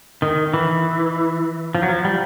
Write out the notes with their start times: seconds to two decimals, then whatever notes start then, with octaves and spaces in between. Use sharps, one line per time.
0.22 D#3
0.54 E3
1.75 F3
1.83 F#3
1.89 F3
2.05 G3